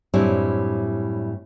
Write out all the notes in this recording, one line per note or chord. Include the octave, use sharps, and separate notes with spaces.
F#2 A2 G3 C4 D4 E4